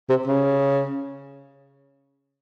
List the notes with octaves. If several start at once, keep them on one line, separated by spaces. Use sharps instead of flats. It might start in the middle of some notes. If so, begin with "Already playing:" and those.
C3
C#3